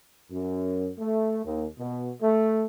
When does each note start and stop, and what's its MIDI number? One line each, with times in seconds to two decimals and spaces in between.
0.31 0.90 42
0.99 1.42 57
1.45 1.66 39
1.79 2.12 47
2.21 2.66 57